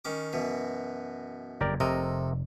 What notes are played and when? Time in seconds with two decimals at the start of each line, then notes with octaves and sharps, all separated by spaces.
0.05 D#3 C#4 D6
0.33 F#2 B2 E3
1.61 F#1 F2 G4 A#4 D5
1.80 F1 C3 A4 A#4 D#5